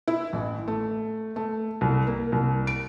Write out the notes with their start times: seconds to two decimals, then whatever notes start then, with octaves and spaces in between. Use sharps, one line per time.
0.08 E4
0.33 A1
0.68 A3
1.36 A3
1.81 C2
2.07 A#3
2.32 C2
2.67 D7